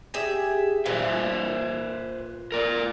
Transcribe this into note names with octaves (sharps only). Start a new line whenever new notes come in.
G4 G#4 E5
A#2 B4 C5 E5
A#4 D5